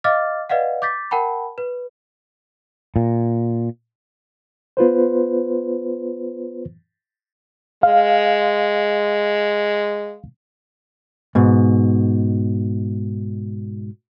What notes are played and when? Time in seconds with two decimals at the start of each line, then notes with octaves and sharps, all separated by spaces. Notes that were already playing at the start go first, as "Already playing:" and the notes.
0.04 D#5 F5 D6 F6 A6
0.49 B4 D5 D#5 F5 F#5
0.82 D6 G6 A6 B6
1.11 A#4 F#5 G5 A5 B5
1.58 B4
2.96 A#2
4.77 B3 F4 B4 C5
7.83 G#3 F5
11.35 G#2 B2